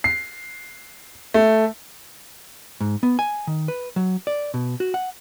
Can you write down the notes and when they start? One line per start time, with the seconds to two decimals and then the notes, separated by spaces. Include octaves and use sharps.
0.04 C7
1.34 A3
2.81 G#2
3.03 B3
3.19 G#5
3.47 D#3
3.68 B4
3.96 F#3
4.27 D5
4.54 B2
4.80 F#4
4.94 F#5